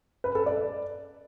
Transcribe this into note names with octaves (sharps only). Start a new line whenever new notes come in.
B4
A4
D5